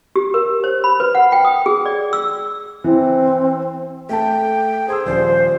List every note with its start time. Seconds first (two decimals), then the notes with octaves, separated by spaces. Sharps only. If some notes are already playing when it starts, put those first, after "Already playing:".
0.16 G4
0.34 A#4
0.64 C5
0.84 B5
1.00 B4
1.15 F#5
1.32 G5
1.45 D#6
1.66 G#4
1.86 D5
2.13 E6
2.84 E3 C4
4.09 A3 G5 A5
4.88 G#4 C5 C6 E6
5.05 D#1 F3 C5 D5